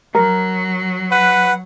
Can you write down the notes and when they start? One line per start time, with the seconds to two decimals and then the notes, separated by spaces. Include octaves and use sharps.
0.15 F#3 A#4
1.11 B4 F#5